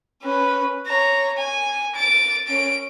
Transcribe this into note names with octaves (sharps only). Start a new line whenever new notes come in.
C#4 B4
C#5 A#5
G#5
A6 D7
C#4 D7